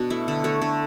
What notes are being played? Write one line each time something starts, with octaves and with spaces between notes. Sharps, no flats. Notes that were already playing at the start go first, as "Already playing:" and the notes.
Already playing: B2 B3 D4
A3 E4
D3
A3 C#5
D3